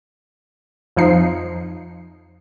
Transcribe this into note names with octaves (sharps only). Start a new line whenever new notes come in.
F2 F3 D#4 C7